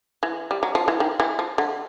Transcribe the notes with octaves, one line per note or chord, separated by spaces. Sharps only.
E3
G3
F#3
F3
E3
D#3
E3
F3
D3